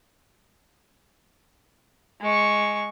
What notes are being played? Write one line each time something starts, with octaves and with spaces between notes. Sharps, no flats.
G#3 C#6